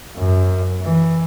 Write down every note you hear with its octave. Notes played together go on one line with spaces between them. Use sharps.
F#2
E3